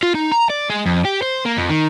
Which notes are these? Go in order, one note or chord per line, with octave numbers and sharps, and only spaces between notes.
F4
D#4
A#5
D5
G#3
F2
G4
C5
A#3
F2
D#3